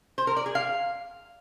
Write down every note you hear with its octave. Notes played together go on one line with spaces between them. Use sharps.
C5
A#4
D5
G#4
F5